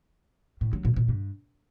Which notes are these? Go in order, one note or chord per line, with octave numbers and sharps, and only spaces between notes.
A2
F#3
A#2
A#2
G2